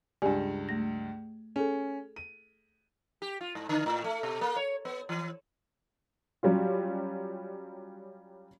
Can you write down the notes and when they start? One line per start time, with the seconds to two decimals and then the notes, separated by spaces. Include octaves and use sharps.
0.22 C#2 G2 G4 D5 G#5
0.69 A3 A#6
1.56 C#4 G#4 A4
2.16 D#7
3.22 G4
3.41 F4
3.55 G#2
3.69 D3
3.86 A2
4.04 A3
4.23 B2
4.41 A#3
4.56 C#5
4.85 B3
5.09 E3
6.43 F#3 G3 C#4 F4